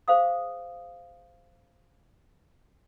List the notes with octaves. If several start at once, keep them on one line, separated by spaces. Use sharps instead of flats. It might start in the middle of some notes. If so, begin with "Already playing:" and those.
G#4 C5 F5 D#6